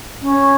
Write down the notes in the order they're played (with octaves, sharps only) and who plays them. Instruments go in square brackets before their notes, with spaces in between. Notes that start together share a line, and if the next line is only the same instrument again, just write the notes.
[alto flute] C#4